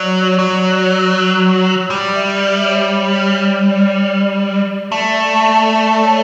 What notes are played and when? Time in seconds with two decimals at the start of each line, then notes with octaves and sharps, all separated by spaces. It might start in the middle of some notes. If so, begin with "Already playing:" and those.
Already playing: F#3 D5
0.39 F#3 D5
1.90 G3 D5
2.15 E5
2.32 E5
2.40 D5
2.65 C#5
3.40 D5
4.91 A3 D5
5.16 E5
5.41 E5
5.66 D5
6.04 C#5